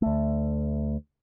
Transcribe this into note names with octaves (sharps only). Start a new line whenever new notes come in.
D2 A3